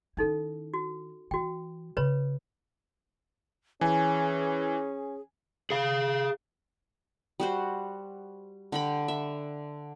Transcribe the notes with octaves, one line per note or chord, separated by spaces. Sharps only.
D#3 C#4 D#4 E4 A4
F#4
E3 F#4 G5
C#3 B4 C#5 B5
E3 C#4 G#4 G#5
G#4 F5
G3 F#4 C5
D3 G5 B5
E5